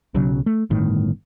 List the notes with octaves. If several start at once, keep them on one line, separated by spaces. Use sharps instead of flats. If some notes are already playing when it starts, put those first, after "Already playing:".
B1 C#3 F#3
A3
G1 A2 D#3